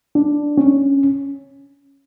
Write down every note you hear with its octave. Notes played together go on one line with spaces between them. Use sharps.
D4
C#4